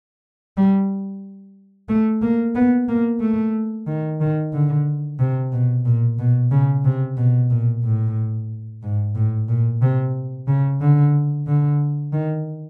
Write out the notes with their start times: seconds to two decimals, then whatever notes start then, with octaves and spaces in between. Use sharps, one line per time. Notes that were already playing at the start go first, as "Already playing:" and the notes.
0.57 G3
1.89 A3
2.22 A#3
2.55 B3
2.88 A#3
3.21 A3
3.87 D#3
4.20 D#3
4.53 D3
5.19 C3
5.52 B2
5.85 A#2
6.19 B2
6.51 C#3
6.85 C3
7.17 B2
7.50 A#2
7.84 A2
8.83 G#2
9.15 A2
9.49 A#2
9.82 C3
10.48 C#3
10.81 D3
11.47 D3
12.13 D#3